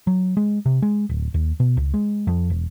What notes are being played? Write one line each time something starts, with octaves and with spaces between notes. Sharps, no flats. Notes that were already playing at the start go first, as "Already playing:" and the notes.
F#3
G#3
C3
G#3
D1
D#2
B2
C#2
G#3
F2
E1